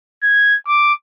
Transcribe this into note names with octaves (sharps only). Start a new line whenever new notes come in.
G#6
D6